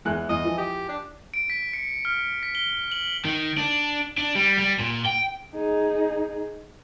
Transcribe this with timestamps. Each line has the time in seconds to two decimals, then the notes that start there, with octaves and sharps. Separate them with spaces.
0.05 E2 G#3 F#6
0.29 E2 D#5
0.44 E3 F3
0.58 G4
0.89 D4
1.34 D7
1.50 B6
1.73 C#7
2.05 F6
2.43 B6
2.55 G7
2.92 F#7
3.25 D#3
3.58 D4
4.17 D4
4.35 G3
4.58 G3
4.78 A#2
5.05 G5
5.55 D#4 G#4